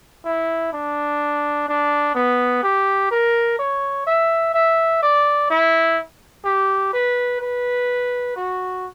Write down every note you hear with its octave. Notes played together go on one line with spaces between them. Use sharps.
E4
D4
D4
B3
G4
A#4
C#5
E5
E5
D5
E4
G4
B4
B4
F#4